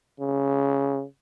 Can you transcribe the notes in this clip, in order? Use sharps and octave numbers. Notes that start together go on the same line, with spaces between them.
C#3